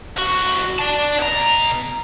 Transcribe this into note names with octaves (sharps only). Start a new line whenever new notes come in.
C2 F#4
D5 A5
B2 A#5